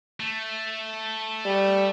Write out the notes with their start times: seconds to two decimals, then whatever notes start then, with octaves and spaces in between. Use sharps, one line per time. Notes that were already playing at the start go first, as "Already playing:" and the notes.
0.20 A3
1.45 G3